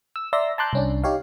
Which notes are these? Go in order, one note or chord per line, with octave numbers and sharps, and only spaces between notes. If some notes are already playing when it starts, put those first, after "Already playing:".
E6
D5 E5 A#5 C6 E6 A#6
A5 A#5 C6 D6 F#6 G6
C2 C#4 D4
D#4 G4 C#5 F5